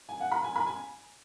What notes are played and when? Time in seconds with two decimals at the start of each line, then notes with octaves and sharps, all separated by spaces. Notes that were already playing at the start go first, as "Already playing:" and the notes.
0.09 G#5
0.20 F#5
0.32 B5
0.44 G#5
0.56 B5
0.66 G#5